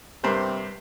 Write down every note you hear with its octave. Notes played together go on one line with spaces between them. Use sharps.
G2 C3 A#4 C5